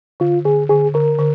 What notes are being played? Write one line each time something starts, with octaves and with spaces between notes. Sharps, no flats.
D3 F4
D3 G#4
D3 G#4
D3 A#4
D3